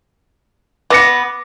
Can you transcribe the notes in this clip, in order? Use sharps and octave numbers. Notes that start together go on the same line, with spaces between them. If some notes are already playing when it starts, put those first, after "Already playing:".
B3 D6 A#6 C#7